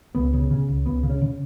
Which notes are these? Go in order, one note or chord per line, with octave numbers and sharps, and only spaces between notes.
C#2 B3
C#3
C#3
C#2
C#2 B3
C#3
C#4
C#3